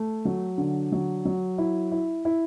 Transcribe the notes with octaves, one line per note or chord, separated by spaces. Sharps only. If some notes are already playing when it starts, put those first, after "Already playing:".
Already playing: A3
F#3
D3
F#3
F#3
E4
E4
E4